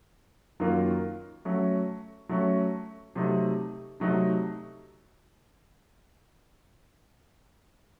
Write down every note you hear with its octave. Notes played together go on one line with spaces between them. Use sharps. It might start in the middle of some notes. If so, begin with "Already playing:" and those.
F#2 D#3 F#3 A#3 F4
F#3 A3 C#4
F#3 A3 C#4
C3 F#3 A3 D#4
C3 F#3 A3 D#4